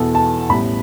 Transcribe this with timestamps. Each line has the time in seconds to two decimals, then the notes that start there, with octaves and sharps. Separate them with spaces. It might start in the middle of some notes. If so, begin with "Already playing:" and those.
Already playing: E2 B2 B3 A4
0.15 A5
0.50 A1 A2 G3 B3 B5